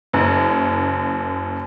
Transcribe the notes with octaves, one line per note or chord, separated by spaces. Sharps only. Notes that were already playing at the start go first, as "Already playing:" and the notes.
F#1 F#2